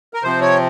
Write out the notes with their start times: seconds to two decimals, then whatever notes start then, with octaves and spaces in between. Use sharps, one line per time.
0.14 A#4
0.23 C3 F3 C4 C5
0.41 C#5